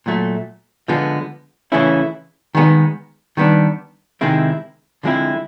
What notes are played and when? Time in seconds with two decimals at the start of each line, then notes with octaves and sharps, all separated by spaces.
0.06 A#2 F#3 A3
0.88 D3 F3 G#3 B3
1.72 C#3 E3 A3 C#4 E4
2.55 D#3 G#3 B3
3.37 D#3 G3 B3 D4
4.21 C3 D#3 G#3 C4 E4
5.03 D3 F3 G#3 C4 E4